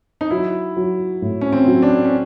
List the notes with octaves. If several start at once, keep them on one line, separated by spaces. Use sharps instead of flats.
D#4
F#3 E4
F#3
A2
C#4
C4
F#3
D4
C#4